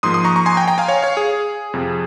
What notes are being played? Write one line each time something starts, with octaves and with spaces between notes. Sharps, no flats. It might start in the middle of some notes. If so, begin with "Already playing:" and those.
G#2 F3 A#3 C6 D#6
C6 D#6
A#5 C#6
A#5 C#6
G#5 C6
G5 A#5
G5 A#5
F5 G#5
C#5 F5
C#5 F5
G#4
F2 C3 F3